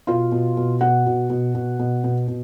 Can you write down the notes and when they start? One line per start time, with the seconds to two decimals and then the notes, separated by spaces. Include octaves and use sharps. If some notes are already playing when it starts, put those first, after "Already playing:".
0.07 B2 F4 F5
0.32 B2
0.57 B2
0.81 B2 F#4 F#5
1.06 B2
1.30 B2
1.55 B2
1.79 B2
2.04 B2
2.28 B2